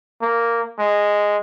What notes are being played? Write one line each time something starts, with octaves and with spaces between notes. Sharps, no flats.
A#3
G#3